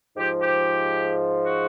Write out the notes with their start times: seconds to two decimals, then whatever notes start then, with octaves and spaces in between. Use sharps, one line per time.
0.16 G#2 F3 G4
0.40 G4
1.44 F#4